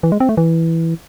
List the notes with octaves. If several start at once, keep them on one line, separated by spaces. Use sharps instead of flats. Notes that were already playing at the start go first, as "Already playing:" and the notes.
E3
G#3
C4
A3
E3